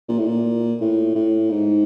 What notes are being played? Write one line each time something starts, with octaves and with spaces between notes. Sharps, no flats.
A#2
A2
A#2
A2
A2
G#2